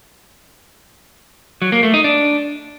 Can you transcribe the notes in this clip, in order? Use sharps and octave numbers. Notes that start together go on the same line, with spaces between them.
F#3
A#3
A3
D#4
D4